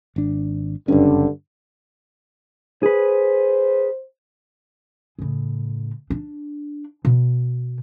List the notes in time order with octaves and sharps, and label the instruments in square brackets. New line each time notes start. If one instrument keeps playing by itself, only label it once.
[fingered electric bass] G#1 D4
[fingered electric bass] F#1 C#4 [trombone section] G2 D3
[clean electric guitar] G#4 B4 [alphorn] C5
[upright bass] A2 C#3
D4
B2